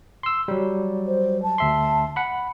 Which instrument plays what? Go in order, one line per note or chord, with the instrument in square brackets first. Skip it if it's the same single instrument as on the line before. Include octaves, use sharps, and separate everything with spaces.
[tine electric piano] C6 E6
F#3 G3
[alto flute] C5
A5
[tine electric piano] D2 E5 C6
F#5 B5